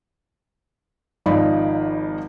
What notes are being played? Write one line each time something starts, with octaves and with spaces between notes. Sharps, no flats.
G#1 F3 D#4 D5 B5